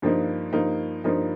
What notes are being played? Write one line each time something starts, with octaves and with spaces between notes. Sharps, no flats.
G2 F3 A#3 D#4
G2 F3 A#3 D#4
G2 F3 A#3 D#4